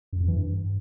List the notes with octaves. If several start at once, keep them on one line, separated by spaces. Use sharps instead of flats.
F#2
F2
E3
G2